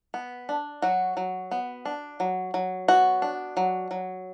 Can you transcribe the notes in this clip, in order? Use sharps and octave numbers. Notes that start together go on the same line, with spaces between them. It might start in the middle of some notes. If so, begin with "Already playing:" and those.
B3
D4
F#3 F#4
F#3
B3
D4
F#3
F#3
B3 F#4
D4
F#3
F#3